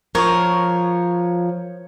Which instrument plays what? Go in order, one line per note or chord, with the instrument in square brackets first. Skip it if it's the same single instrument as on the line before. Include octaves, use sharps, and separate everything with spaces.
[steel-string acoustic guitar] F3 A#4 [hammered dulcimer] C#5